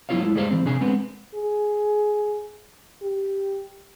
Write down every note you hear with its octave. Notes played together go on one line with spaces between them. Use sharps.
F#3 B3 E4 F4 C#5 F5
G#3 E4
G3 G#3 G#4 C5 C#5 F5
E3 C4
C3 D4 G#4 G#5
G#3 B3 C4
G#4
G4